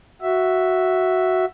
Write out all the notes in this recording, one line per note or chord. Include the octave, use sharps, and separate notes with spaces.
F#4 E5